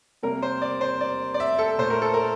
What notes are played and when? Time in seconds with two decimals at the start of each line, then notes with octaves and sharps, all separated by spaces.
0.23 C3 G3 A#3 A#4
0.42 C5
0.62 D5
0.81 C5
1.01 D5
1.34 D5
1.40 E5
1.59 A4
1.78 A#2 A3 C5
1.90 A#4
2.02 A4
2.14 A#4